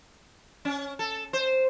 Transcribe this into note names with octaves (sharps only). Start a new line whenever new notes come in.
C#4
A4
C5